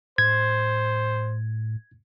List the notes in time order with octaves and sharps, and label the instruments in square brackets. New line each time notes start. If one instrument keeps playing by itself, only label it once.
[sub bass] A2 [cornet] C5 [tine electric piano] G#6